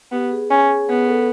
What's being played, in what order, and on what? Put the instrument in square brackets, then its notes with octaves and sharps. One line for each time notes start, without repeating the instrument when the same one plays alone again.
[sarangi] B3 [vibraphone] G4
[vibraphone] G#4
[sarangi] C#4 [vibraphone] G#4
[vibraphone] G#4
[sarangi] B3 [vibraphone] G#4
[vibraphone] A4